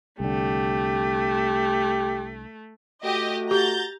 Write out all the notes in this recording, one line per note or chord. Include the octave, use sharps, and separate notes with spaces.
C2 D3 A3 G4
A3 F#4 G4 D#5
G4 A#5 G6 A6